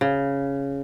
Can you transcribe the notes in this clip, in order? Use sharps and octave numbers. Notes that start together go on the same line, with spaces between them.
C#3